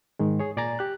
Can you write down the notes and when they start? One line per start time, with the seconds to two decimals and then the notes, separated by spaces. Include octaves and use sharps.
0.19 G#2 D#3 G#3
0.39 G#4 C#5
0.57 A#2 D5 G#5 A#5 A6
0.79 G4 F#6